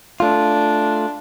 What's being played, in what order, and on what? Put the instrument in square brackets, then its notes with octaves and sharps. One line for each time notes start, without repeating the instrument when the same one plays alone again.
[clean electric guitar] A3 F4 [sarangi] D4